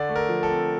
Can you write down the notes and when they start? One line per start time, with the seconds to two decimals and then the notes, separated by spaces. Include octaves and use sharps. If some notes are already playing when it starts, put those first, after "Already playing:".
Already playing: D3 D5
0.09 A3
0.16 A#4
0.29 F3
0.43 A4
0.50 C4